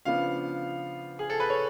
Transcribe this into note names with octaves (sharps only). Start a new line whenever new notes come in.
C#3 F3 B3 D4 F5
G#4
A4
B4
C#5